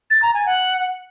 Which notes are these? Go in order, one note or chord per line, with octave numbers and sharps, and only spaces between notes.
A6
A#5
G#5
F#5